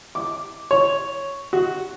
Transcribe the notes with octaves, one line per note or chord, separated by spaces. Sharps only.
D6
C#5
F#4